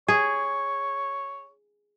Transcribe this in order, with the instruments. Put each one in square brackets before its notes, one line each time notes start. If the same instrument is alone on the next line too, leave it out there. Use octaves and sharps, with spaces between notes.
[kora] G#4 [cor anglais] C#5